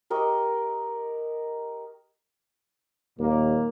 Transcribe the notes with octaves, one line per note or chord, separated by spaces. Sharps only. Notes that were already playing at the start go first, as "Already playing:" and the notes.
G4 A#4 D#5 C#6
D#2 A#2 G3 A#3